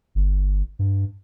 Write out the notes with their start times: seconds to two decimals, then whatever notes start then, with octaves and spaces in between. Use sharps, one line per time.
0.15 G1
0.79 G2